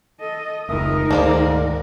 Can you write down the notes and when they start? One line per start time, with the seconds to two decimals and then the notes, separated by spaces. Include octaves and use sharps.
0.20 A4 D#5
0.69 F1 C#2 D#3 D#4 A#4 E5 D#6
1.11 D2 G#2 D3 D#3 G#3 A#3 D4